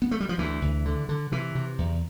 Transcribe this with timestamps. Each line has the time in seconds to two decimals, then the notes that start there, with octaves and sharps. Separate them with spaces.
0.02 B3
0.11 A3
0.20 G3
0.29 F3
0.38 D2 E3
0.62 D2
0.85 D3
1.09 D3
1.32 C3 E3
1.55 C3
1.78 E2